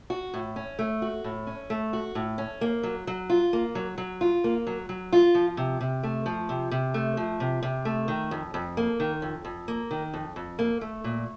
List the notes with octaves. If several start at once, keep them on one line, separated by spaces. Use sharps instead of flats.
F#4
A2
C#4
A3
F#4
A2
C#4
A3
F#4
A2
C#4
A#3
F#3
F#3
F4
A#3
F#3
F#3
F4
A#3
F#3
F#3
F4
F3
C3
C3
A3
F3
C3
C3
A3
F3
C3
C3
A3
D#3
F2
F2
A#3
D#3
F2
F2
A#3
D#3
F2
F2
A#3
A3
A#2